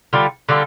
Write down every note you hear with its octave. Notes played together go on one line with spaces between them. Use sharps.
D3 G3 F4 A4
D3 G3 F4 A4